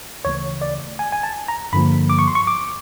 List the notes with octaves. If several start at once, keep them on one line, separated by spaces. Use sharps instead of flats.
D2 C#3 E3 A3 C#5
D5
G#5
G#5
A5
A#5
G2 D3 F3 A#3 B5
D6
C#6
C6
C#6
D6